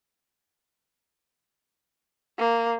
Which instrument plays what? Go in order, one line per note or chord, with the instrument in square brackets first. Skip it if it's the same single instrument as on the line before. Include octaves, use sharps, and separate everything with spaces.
[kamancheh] A#3